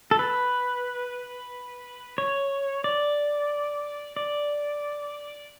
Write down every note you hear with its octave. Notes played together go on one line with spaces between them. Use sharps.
A4
B4
C#5
D5
D5